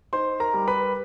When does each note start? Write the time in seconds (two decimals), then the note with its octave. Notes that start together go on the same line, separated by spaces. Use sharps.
0.13 D#4 C5 C6
0.40 A#4 A#5
0.54 G3
0.68 B4 B5